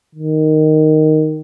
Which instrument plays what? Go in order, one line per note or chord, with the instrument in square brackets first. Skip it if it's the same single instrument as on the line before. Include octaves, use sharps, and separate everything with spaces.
[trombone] D#3